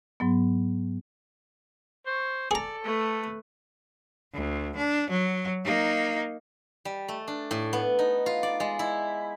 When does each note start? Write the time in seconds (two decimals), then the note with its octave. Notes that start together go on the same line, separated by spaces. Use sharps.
0.20 G#2 F#3 B3
2.06 C5 C#6
2.51 G#4 A4 D5 A#5
2.84 A3 B4
4.33 D2
4.76 D4
5.10 F#3
5.64 A#3 D#4
6.85 G3
7.08 A3
7.28 D4
7.51 A2
7.73 B3
7.99 D#4
8.26 F4
8.43 D5
8.60 G#3
8.79 E4